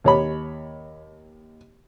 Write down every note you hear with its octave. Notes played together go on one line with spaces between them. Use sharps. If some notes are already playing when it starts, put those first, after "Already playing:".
D#2 C#5 B5